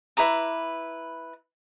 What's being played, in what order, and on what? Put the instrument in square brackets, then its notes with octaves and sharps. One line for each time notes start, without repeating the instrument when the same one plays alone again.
[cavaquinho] E4 B4 A#5 D6